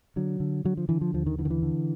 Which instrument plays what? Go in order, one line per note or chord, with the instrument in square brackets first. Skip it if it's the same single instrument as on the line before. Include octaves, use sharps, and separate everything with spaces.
[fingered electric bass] D3 F#3
D3
D3 F#3
F3
D3 E3
F3
D#2 F3
D#3
D3 E3
D#3
E3
D3